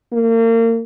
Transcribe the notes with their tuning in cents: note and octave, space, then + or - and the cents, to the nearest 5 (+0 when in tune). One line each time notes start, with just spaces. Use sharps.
A#3 -35